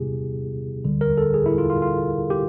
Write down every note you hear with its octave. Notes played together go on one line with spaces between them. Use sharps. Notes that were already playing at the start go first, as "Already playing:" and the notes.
Already playing: C3 D#3 G3 B3 E4 G4 G#4
D2 D3 G3
A#4
A4
G#4
E4
F4
F4
F4
G4